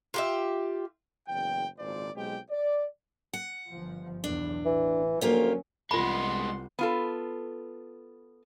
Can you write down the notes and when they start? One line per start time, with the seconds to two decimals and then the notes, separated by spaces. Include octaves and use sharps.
0.14 F4 G4 E5
1.28 F#1 E2 G5
1.78 G#1 C#2 A#2 C5 D5
2.15 B1 G#3 C4 G4 G5
2.51 D5
3.33 F#5
3.71 G1 F3
4.24 B1 E2 A2 D4
4.65 A1 E3
5.21 D2 F3 F#3 A#3 C#4 F4 G4
5.91 C2 G#3 B3 F4 F#5 B5 C6
6.79 B3 F4 A4